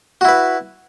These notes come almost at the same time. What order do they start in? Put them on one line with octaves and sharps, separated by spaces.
F#4 E4 B4